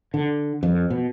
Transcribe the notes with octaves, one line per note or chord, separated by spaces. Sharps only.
D3
F2
B2